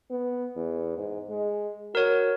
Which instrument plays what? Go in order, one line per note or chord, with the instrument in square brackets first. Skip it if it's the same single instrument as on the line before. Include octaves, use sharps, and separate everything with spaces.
[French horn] B3
E2
G#2
G#3
[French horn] F#4 [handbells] A#4 C#5